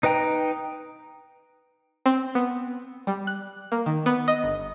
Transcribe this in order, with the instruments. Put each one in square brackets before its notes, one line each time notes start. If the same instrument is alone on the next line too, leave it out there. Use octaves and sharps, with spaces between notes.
[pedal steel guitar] D#4 B4 D#5 G5 A#5
[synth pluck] C4
B3
G3
F#6
A#3
D#3
B3
D#5
G1